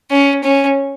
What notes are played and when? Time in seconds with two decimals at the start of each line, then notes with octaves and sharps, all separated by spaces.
0.11 C#4
0.43 C#4